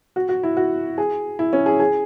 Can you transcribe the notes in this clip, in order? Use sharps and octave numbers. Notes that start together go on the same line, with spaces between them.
F#4
F#4
E4
F#4
G#4
E4
C#4
G#4
G#4